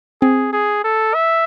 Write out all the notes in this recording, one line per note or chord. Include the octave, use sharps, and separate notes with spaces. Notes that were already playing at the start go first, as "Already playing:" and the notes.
C4 G#4
G#4
A4
E5